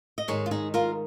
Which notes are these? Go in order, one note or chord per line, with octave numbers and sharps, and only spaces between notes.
D#5
G#2 D#3 G#4 C#5
F4
D#4 G#4
F4 A#4